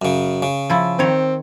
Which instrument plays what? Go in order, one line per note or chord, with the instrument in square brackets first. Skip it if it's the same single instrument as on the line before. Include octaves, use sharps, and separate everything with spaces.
[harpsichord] F#2 C#3
C#3
[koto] F3 E4
[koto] D#3 C#5 [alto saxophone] C4